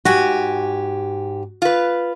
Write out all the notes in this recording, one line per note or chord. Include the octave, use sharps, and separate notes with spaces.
G#2 F#4 G4 G#5
F4 B4